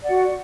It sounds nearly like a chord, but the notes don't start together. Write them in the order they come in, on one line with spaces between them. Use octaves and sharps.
D5 F#5 F#4